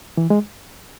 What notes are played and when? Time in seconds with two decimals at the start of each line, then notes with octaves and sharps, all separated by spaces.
0.17 E3
0.30 G#3